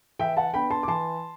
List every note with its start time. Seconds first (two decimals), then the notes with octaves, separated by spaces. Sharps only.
0.19 E3 E5 G5
0.37 F#5 A5
0.53 B3 D4 G5 B5
0.71 A5 C6
0.83 D6
0.88 E3 A5 C6